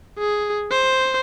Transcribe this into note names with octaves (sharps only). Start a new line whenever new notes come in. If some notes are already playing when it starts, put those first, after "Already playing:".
G#4
C5